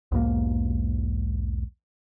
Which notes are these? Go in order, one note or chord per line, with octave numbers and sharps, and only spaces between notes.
B1 E2 G#2 A#3